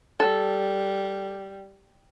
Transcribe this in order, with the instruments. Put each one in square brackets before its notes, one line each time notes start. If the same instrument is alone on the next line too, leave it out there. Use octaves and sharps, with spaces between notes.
[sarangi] G3 [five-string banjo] A4